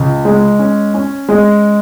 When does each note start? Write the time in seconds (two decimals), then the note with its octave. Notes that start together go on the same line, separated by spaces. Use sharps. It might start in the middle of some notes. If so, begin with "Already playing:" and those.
Already playing: C#2
0.25 G#3
0.59 C#4
0.94 C#4
1.29 G#3